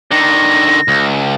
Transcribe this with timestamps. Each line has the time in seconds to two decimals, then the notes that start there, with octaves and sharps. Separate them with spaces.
0.11 D3 D#3 A#6
0.88 C#2